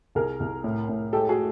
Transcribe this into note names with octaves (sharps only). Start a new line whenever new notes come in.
C2 G#4 A#4
C2
A2
A2
G#3 G4 A4
F#4 G#4